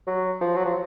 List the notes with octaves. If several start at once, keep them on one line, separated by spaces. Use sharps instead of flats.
F#3
F3
F#3
F3